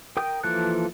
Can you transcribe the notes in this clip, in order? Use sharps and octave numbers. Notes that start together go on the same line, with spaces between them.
A#4 G5 D#6 G6
E3 F3 A#3 A4 F#6